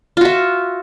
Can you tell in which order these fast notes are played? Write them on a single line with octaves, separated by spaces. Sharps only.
F4 F#4 E5